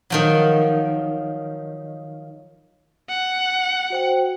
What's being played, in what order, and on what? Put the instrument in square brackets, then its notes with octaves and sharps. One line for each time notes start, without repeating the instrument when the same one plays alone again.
[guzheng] D#3 F3 F#3
[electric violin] F#5
[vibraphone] F#4 C5 G5